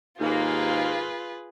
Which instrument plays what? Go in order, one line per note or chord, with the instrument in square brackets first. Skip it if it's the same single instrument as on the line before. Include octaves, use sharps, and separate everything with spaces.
[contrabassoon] D#2 [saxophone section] G#2 A#3 [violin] F4 [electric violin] G#4 B4